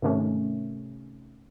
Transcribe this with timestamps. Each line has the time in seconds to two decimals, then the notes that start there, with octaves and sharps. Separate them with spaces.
0.02 G#2 C3 D#3 A3 C#4